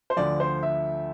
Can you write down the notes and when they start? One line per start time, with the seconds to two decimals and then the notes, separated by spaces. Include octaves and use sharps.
0.10 C5
0.17 D2 D3 F3 D5
0.40 C5
0.63 E5